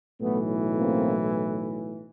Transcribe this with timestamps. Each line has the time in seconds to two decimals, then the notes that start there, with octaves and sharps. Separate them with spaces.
0.21 B1 A2 E3 A3 B3
0.78 A#3 C4